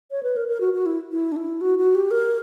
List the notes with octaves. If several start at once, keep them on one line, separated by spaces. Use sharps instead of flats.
C#5
B4
A#4
A#4
F#4
F#4
E4
E4
D4
E4
F#4
F#4
G4
A#4